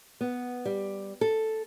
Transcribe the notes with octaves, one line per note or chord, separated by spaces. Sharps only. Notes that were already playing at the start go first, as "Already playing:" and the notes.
B3
G3
A4